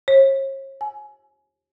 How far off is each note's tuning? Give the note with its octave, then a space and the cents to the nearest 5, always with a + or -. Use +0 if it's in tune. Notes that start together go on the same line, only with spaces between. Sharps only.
C#5 -40
G#5 +25